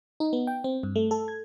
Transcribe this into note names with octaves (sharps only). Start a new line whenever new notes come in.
D#4
B3
G5
C4
G2
A3
A4
G#6